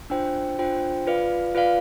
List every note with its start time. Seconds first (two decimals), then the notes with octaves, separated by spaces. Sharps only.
0.10 D4 F4 C5 G5
0.59 D4 F4 C5 G5
1.06 F4 B4 D5 F5
1.54 F4 B4 D5 F5